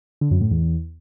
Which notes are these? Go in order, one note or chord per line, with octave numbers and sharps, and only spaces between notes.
D3
F#2
A2
E2